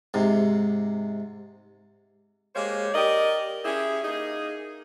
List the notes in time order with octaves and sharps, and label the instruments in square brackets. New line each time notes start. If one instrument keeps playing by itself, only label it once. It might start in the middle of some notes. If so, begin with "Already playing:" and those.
[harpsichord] G#2 C3
[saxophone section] G#3 A#3 G4 C5 C#5
G4 A#4 D5 D#5
C#4 E4 G4 G#4
A#3 D#4 G#4